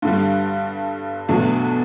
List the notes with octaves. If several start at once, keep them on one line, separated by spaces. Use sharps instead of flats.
G2 D3 G3
E2 B2 F#3 A3 D4